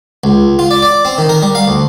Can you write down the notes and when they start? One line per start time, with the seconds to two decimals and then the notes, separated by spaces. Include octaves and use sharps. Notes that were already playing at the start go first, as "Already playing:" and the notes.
0.24 C#2
0.59 F4
0.71 D5
0.82 D5
1.05 C4
1.18 D#3
1.29 A#4
1.43 G3
1.55 F5
1.67 D2